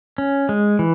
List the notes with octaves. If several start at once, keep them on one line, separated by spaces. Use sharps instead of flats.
C#4
G#3
E3